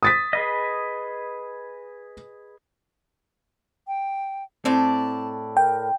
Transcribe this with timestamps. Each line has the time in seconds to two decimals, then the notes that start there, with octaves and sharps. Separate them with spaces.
0.03 D#6 A6 B6
0.33 G#4 B4 D#5
3.88 G5
4.65 A2 C4 D5 A5
5.57 A#4 G5